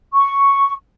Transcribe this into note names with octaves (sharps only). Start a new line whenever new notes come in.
C#6